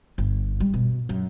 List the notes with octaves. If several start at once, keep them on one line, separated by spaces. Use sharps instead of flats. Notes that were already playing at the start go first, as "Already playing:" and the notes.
G1
G3
B2
F#2